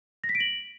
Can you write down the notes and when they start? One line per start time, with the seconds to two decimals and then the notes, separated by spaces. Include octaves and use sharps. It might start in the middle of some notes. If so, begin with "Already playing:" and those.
0.24 A#6
0.29 B6
0.35 D7
0.40 F#7